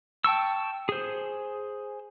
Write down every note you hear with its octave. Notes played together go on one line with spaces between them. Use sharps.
G5 A5 C#6 E6
G#4 C5